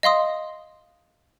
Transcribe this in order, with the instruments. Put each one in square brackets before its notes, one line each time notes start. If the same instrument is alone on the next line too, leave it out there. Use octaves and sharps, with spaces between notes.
[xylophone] D#5 F5 C6 D#6